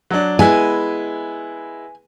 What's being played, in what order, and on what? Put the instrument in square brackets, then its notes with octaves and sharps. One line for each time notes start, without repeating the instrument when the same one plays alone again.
[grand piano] F#3 D4
[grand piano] G#3 B3 E4 [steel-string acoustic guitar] G#5